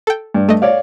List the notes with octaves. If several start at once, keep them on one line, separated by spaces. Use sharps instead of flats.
A4 G5
G2
A3 D#5
C#5 D5 F5